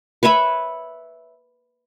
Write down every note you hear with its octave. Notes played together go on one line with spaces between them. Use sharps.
B4 C#5 E5 B5